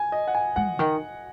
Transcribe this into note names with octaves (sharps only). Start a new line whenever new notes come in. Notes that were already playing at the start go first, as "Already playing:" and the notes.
Already playing: G#5
D#5
F#5
G#5
G#3 F#5
C#3
D#3